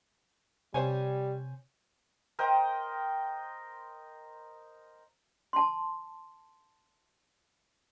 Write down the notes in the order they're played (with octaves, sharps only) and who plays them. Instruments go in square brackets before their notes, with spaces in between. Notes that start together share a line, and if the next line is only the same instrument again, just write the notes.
[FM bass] C3 [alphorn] G3 [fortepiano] C5 C#5 G#5
[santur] A#4 C5 D#5 G5
[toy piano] A5 C6